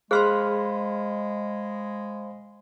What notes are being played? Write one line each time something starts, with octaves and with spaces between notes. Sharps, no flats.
G#3 G#4 C5 F5 B5 C6 F6 F#6